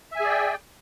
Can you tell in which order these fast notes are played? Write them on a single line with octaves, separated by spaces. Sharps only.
E5 G#5 G#4 D5 G5